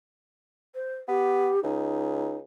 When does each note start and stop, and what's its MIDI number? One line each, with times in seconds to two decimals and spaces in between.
0.75 0.95 72
1.08 1.51 59
1.08 1.60 67
1.63 2.43 37
1.63 2.35 63